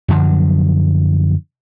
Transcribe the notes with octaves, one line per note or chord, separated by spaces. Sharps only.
F#2 D3 F3 F#3